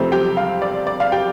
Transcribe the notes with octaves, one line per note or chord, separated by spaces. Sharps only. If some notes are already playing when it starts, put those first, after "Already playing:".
Already playing: F2 C3 A3 C4 C5
G4 G5
F5
D5
D5
F5
G4 G5